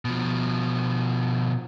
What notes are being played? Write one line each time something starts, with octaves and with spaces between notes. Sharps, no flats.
B2 F3